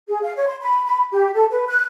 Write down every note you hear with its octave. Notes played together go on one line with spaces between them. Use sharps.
G#4
F5
C#5
C6
B5
B5
G4
A4
B4
F#6